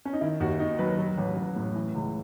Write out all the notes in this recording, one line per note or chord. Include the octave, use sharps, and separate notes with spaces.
C#4
D#4
D#3 E4
D#2 F#4
D#3 D#4
F#3 B4
F#3
A1
A1
A2
E3
C#2